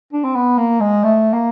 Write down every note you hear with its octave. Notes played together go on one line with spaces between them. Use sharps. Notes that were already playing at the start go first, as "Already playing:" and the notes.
D4
C4
B3
A#3
G#3
A3
A#3